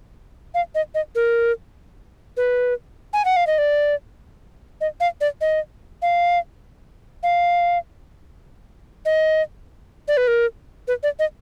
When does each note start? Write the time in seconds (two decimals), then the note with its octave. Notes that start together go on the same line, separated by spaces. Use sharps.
0.54 F5
0.75 D#5
0.95 D#5
1.15 A#4
2.37 B4
3.13 G#5
3.25 F#5
3.36 F5
3.47 D#5
3.58 D5
4.81 D#5
5.00 F5
5.21 D5
5.41 D#5
6.02 F5
7.23 F5
9.05 D#5
10.08 D5
10.17 B4
10.28 A#4
10.88 B4
11.03 D5
11.19 D#5